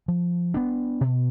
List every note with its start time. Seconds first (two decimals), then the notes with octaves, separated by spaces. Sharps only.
0.08 F3
0.54 B3 D4
1.01 B2